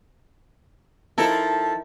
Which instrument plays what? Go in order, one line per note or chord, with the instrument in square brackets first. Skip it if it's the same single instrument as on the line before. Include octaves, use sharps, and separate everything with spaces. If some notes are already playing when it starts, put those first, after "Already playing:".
[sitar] F3 A4 [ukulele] D#4 E4 A#4